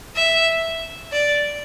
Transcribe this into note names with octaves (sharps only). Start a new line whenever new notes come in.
E5
D5